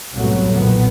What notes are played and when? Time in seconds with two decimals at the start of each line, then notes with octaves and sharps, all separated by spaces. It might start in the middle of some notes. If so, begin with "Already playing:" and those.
0.13 C2 F#2 A2 F#3 A3 B3
0.51 F#1 B1 A#2 D#3 B3